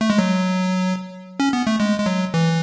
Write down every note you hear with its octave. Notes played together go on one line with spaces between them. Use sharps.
A3
G#3
F#3
C#4
B3
A3
G#3
G#3
F#3
E3